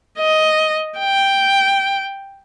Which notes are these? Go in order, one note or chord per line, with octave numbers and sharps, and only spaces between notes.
D#5
G5